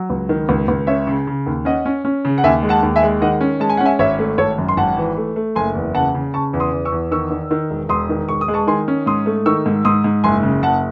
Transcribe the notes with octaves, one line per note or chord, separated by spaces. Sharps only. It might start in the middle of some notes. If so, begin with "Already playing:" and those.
Already playing: F#3
C#2
D#3
C#2
C#2
C#4 C#5 E5
C#3
C#3
D#2
C#4 D#5 F#5
C#4
C#4
C#3
F#5
D#2 E5 G#5
G#3
F#5 A5
D#2
E5 G#5
G#3
D#3 D#5 F#5
C#4
G#3 A5
G#5
C#4 F#5
E5 G#5
G#1 C#5 E5
A3
G#1 A4 C#5
F#2
C6
G#1 F#5 A5
E3
A3
A3
F#1 G#5 C6
E2
C#3 F#5 A5
C#3
C#3 A5 C#6
E2
C6 D#6
E2
C#6 E6
E2
D#3 C#6 E6
D#3
D#3
E1
E1 C6 D#6
D#3
E1 C#6
D#6
G#3
A5 C#6
D#3 G#5 C6
C#4
G#2 C6 D#6
A3
D#3 C#6 E6
G#2
G#2 C6 D#6
G#2
F#1 G#5 C6
C#3
F#1 F#5 A5